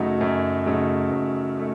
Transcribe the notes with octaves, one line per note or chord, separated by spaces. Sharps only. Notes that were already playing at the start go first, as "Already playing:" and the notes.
Already playing: F#2 C#3 F#3 A3 D#4
F#2
C#3 F#3 A3 D#4
F#2
A3 D#4